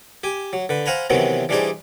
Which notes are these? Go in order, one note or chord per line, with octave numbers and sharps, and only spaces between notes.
G4 G#5
F#3
D3 B4
C5 F5 F#5 G#5 A#5 B5
C3 D#3 E3 F#3 B3 C4
E3 G3 D4 D#4 G#4 C5